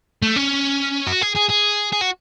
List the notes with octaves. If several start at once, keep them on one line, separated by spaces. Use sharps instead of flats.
A3
C#4
F#4
G#4
G#4
G#4
G#4
F#4